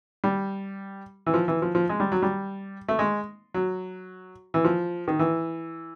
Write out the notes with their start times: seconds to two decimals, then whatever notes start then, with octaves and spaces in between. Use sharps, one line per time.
0.24 G3
1.27 E3
1.34 F3
1.48 E3
1.62 F3
1.75 F3
1.89 G#3
2.00 G3
2.12 F#3
2.23 G3
2.88 A3
2.99 G#3
3.54 F#3
4.54 E3
4.64 F3
5.08 D#3
5.19 E3